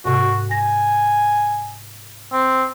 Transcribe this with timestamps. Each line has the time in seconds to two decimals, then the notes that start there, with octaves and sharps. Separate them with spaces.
0.05 G#2 C3 F#4
0.51 G#5 A#6
2.33 C4